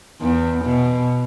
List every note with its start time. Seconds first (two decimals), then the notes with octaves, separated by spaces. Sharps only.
0.21 E2
0.64 B2